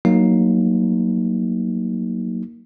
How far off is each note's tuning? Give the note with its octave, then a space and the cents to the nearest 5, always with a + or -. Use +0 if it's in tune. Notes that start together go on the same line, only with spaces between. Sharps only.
F#3 +0 A#3 +0 D#4 +0